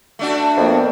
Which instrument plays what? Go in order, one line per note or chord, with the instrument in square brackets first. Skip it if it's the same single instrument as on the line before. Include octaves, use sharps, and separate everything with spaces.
[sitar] A3 D4 F#4
[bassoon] F2 [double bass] A#3 B3